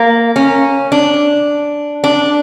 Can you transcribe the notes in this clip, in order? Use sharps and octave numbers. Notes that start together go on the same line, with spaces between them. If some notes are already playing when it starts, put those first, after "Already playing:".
Already playing: A#3
C#4
D4
D4